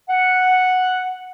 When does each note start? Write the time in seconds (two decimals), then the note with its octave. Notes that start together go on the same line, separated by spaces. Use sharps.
0.09 F#5